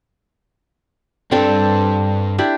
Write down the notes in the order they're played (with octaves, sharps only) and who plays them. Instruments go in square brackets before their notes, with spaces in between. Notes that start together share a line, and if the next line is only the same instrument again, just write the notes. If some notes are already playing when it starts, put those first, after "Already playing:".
[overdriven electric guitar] C2 G2 [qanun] C4 D4 A4
[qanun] D4 E4 G4